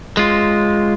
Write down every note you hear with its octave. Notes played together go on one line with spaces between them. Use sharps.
G#3 F4